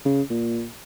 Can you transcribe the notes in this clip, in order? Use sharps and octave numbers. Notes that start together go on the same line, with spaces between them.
C#3
A#2